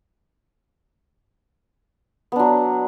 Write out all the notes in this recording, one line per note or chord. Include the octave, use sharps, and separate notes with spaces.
F#3 B3 D4